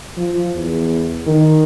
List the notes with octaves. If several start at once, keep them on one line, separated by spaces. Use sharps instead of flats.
F3
E2
D#3